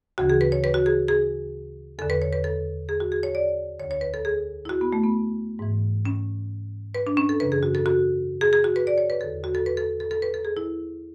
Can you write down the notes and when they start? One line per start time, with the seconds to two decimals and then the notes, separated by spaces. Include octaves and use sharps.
0.18 D2 C#3 E3 F#4
0.30 G#4
0.41 B4
0.52 C#5
0.64 B4
0.74 F#4
0.86 G#4
1.08 G#4
1.99 E2 D3 A4
2.10 B4
2.22 C#5
2.33 B4
2.44 A4
2.89 G#4
3.00 F#4
3.12 G#4
3.23 C#5
3.35 D5
3.79 D3 C#5
3.84 D2
3.91 C#5
4.01 B4
4.14 A4
4.25 G#4
4.65 E4
4.69 F#4
4.81 B3
4.93 A3
5.04 B3
5.59 G#2 E3
6.05 C#4
6.95 B4
7.07 D4
7.17 C#4
7.29 A4
7.40 F#2 C#3 E3 B4
7.52 G#4
7.63 F#4
7.75 A4
7.86 F#4
8.41 G#4
8.53 G#4
8.64 F#4
8.76 B4
8.87 D5
8.98 C#5
9.10 B4
9.21 E2 D3 A4
9.44 F#4
9.55 A4
9.66 B4
9.77 A4
10.00 A4
10.11 A4
10.22 B4
10.34 A4
10.45 G#4
10.57 E4